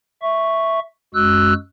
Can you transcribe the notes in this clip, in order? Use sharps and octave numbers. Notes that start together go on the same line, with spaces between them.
E5 C#6
F#2 G#3 F#4 E6 F#6